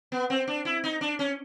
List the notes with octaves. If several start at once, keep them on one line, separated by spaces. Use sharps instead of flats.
B3
C4
D4
E4
D#4
D4
C#4